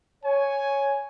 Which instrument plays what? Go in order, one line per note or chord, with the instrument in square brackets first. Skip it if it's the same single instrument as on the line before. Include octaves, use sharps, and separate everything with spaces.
[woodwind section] C#5 [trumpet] G#5